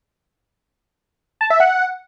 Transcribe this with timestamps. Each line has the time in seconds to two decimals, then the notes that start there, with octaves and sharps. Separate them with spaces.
1.41 A5
1.50 E5
1.60 F#5